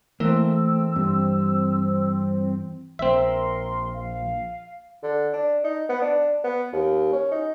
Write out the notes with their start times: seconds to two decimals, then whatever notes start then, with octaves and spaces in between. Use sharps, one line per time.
0.20 E3 A3 A#3 C4 E6
0.96 G2 C4
2.99 A#1 C4 A#4 E5 C6
3.93 F5
5.03 D3
5.33 D4
5.64 D#4
5.89 B3
6.02 D4
6.44 B3
6.72 D#2
7.12 C#4
7.31 D#4